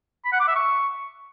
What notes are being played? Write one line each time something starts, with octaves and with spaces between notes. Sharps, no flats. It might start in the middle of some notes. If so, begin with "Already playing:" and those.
B5
F#5
D6
E5
C#6